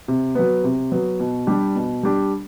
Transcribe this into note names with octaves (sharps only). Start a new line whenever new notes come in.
C3
F#3 B3
C3
F#3 B3
B2
G3 D4 G4
B2
G3 D4 G4